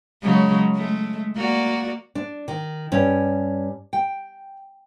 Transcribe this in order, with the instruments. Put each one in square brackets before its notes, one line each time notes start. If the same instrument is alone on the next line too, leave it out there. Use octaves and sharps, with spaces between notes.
[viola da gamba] C#3 F#3 G#3
G#3 A3
A#3 F#4 D5
[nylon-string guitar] D4
D#3
G2 C#4
G5